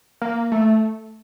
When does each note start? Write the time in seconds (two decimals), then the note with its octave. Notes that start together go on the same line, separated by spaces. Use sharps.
0.22 A#3
0.52 A3